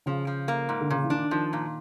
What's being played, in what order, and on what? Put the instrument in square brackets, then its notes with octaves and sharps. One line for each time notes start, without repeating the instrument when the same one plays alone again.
[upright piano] C#3 [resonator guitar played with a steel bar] F3
[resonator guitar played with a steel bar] F3
A#3
G#2
[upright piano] D3
[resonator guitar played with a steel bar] A#2 [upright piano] C#3
[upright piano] E3
[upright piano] D#3 [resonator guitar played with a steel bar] D4
[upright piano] D#3 [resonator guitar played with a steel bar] F3
[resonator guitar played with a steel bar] A#2